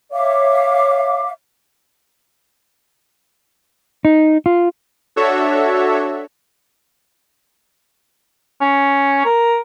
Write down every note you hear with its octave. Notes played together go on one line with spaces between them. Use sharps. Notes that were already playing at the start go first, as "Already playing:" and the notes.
C#5 E5 F5 D6
D#4
F4
D4 F#4 A4 C#5 E5
C#4
A#4